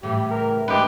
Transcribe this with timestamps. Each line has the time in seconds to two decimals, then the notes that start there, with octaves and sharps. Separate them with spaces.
0.03 A2 C#3 E3 G4
0.31 A#4
0.68 E3 G#3 A3 D4 G4 B4